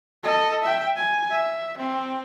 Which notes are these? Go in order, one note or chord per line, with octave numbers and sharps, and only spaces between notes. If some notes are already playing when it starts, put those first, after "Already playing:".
A4 D#5
E5 G5
G#5
E5
C4